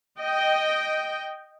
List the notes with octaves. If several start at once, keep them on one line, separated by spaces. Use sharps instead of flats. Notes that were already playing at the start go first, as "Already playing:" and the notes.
D#5 G5